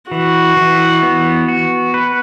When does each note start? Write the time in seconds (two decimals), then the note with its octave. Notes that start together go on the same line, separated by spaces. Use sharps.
0.11 E3 F#4
0.57 E3
1.03 B3
1.48 F#4
1.94 B4